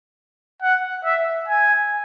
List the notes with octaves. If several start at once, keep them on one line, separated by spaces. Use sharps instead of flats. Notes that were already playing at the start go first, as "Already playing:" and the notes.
F#5
E5
G#5